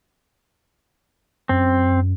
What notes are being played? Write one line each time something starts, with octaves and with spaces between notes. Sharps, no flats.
F#2 C4